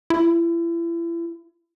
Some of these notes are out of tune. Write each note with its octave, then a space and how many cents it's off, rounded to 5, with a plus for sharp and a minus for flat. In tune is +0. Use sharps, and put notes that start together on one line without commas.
E4 +35